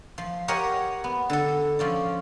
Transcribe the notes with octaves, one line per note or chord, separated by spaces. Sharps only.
F3
G4 A#4 C#5 D#5 F#5
B3
D3 A4
F3 C#4 D5